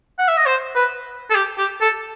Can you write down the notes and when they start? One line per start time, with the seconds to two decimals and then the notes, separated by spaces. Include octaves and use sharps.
0.19 F#5
0.28 E5
0.37 D#5
0.46 C5
0.75 B4
1.30 A4
1.35 G4
1.58 G4
1.81 A4